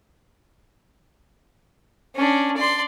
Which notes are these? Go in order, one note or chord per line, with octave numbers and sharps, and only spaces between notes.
C#4 D4
D5 C6